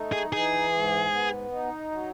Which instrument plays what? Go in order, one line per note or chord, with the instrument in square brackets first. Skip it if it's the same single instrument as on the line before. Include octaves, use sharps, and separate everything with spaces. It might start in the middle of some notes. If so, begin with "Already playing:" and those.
Already playing: [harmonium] A3 D#4
[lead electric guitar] G#4
[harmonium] E3 [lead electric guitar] G#4
[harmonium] G#2
B3
D#4
F#3